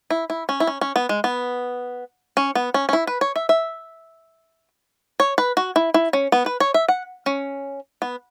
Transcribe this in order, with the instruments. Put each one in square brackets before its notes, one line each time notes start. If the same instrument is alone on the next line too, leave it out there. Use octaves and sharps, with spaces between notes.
[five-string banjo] E4
E4
C#4
E4
C#4
C#4
B3
G#3
B3
C#4
B3
C#4
C#4
E4
B4
C#5
E5
E5
C#5
B4
F#4
E4
E4
C#4
B3
B4
C#5
E5
F#5
C#4
B3